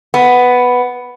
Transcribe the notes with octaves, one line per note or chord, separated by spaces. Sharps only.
B3